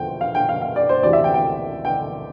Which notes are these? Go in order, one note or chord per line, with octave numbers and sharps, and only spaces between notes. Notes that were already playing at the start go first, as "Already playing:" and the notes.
Already playing: E2 D3 F3 G5
F5
G5
F5
F5
D5
C5
D2 C3 E3 D5
E5
G5
G5
G5